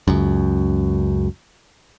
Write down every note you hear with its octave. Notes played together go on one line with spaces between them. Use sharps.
C#2 F#2